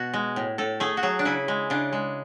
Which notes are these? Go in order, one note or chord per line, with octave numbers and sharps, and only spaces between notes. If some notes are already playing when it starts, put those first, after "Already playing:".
Already playing: B2 F#4
G#3
A2
A2 A4
A3 G#4
F#4
F#3 G#4
D4
C#3 E4
G#3
C#3 D4
G#3